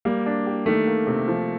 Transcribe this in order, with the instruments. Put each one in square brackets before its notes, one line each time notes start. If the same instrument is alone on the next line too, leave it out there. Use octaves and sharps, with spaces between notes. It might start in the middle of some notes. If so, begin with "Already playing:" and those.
[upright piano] G3 [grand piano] A#3
[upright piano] D4
G4
[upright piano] D#3 [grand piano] A3
[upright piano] A#3
C3
F3